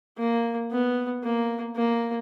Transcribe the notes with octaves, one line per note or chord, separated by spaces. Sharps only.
A#3
B3
A#3
A#3